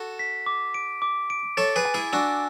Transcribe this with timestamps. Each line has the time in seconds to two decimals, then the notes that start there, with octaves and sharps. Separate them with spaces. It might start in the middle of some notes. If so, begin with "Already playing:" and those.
Already playing: F#4 A4
0.19 B6
0.46 D6
0.74 D7
1.02 D6
1.30 D7
1.57 A4 C#5 A6
1.76 G#4 B4
1.85 G#5
1.94 E4 G#4
2.13 D4 F#4 E6